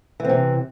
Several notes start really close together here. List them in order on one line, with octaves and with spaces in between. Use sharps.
E3 C4 C3